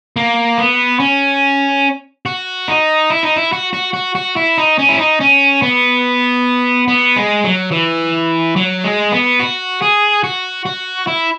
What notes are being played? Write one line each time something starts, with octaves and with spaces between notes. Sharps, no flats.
A#3
B3
C#4
F#4
D#4
E4
D#4
E4
F#4
F#4
F#4
F#4
E4
D#4
C#4
E4
D#4
C#4
B3
B3
G#3
F#3
E3
F#3
G#3
B3
F#4
G#4
F#4
F#4
E4